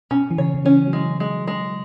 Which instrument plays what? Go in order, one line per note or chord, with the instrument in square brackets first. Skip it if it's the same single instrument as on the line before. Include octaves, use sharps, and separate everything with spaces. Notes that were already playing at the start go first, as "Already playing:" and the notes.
[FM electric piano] B2 [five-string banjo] C#4
[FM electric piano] E3
[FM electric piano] C#3 [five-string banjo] C#5
[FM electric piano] C#3
[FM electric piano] E3 [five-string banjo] C#4
[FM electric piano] F#3
[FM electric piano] E3 [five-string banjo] G#3
[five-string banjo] G#3
G#3